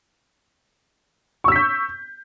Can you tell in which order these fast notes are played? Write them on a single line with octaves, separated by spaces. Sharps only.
C#6 E6 B6 G6